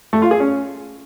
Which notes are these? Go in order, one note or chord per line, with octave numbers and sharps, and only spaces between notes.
A3
F4
G#4
C#4